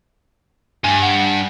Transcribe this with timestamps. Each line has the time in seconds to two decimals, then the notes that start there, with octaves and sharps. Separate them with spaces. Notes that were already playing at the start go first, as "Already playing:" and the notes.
0.84 G2 G#5
1.02 F#5